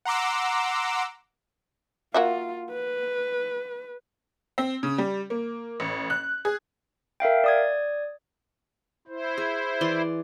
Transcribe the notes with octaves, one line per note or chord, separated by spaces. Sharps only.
F#5 A#5 C6 D6 E6
A#3 F4 F#4 E5
B4
C4
C#3
G3
A#3
A1
F#6
G#4
A#4 E5 F5 G5
D5 D#6 G#6
E4 C5
G#4
E3 D5 C6